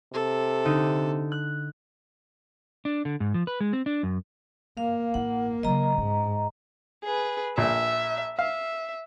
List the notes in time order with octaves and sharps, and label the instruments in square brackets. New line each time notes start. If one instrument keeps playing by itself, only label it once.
[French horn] C3 [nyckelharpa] A4
[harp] D3 D#4
F#6
[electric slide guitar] D4
D3
G#2
F3
B4
G#3
C4
D4
F#2
[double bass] A#3 [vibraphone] F5
[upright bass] A1 E4 [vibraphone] F#5
[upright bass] C#3 F#3 [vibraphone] D#5 A#5
[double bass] G#2 [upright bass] C#4
[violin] G#4 B4
[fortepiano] A#1 A#2 [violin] E5
[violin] E5 [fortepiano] F5